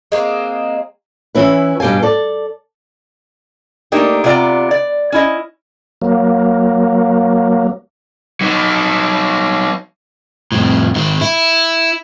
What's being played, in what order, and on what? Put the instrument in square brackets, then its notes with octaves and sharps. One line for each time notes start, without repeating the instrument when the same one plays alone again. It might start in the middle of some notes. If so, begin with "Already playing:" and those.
[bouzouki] G#3 A#3 C4
[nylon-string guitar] E3 C#4 E4 B4
G2 B2 G4 F5 G#5
A4 D5
[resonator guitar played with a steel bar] A3 A#3 D4 D#4 G4 A#4
C3 B3 F4 D5 A#5
D5
C#4 E4 D#5
[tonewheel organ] F#3 A#3
[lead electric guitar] F#3 D#4
[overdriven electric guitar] F2 A2
G#2 D#3
E4